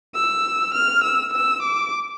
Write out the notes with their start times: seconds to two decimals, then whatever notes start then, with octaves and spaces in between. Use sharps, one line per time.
0.15 E6
0.74 F6
1.03 E6
1.33 E6
1.62 D6